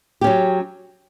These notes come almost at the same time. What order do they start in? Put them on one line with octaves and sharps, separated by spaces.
G4 C#4 F#3